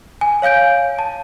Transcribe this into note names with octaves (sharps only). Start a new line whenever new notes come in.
G#5
C#5 F5 G#5 G6 D7
A5